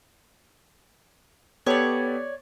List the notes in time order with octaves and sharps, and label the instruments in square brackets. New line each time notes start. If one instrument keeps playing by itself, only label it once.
[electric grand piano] B3 G4 A4 [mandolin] C#5 D5